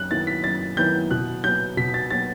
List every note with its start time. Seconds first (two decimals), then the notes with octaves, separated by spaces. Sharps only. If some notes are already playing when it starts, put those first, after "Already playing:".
Already playing: F#2 F#6
0.10 D#3 F#3 B3 E4 A6
0.27 B6
0.44 F#2 A6
0.77 D#3 F#3 B3 E4 G6
1.11 B2 F#6
1.44 F#3 B3 G6
1.77 B2 B6
1.94 A6
2.10 F#3 B3 A6